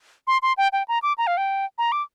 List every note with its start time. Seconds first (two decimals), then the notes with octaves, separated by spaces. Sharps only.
0.27 C6
0.42 C6
0.58 G5
0.73 G5
0.88 A#5
1.03 D6
1.18 A#5
1.27 F5
1.37 G5
1.78 A#5
1.92 D6